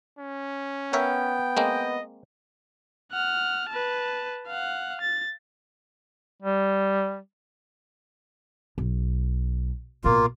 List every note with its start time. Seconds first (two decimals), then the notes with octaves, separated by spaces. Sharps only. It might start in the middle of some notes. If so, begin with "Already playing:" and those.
0.18 C#4
0.93 B3 A#4 C#5 E5 G5
1.57 G#3 A#3 C4 D#5
3.12 F#5 F6
3.69 B4 A5
4.47 F5 F#5
5.01 A6
6.42 G3
8.78 B1
10.04 A1 B2 A#3 F4